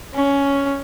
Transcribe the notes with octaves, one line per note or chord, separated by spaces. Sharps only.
C#4